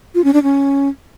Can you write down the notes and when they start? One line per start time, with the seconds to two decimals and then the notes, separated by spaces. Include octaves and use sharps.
0.15 F4
0.24 C#4
0.34 D4
0.43 C#4